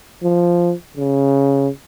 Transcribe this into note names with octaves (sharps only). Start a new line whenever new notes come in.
F3
C#3